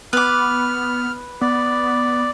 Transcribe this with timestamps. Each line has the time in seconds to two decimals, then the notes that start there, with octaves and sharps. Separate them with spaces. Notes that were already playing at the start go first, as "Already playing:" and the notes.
0.13 B3 B4 D6 F6
1.41 B3 D5